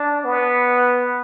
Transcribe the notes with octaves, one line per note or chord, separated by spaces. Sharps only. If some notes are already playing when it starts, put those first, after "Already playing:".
Already playing: D4
B3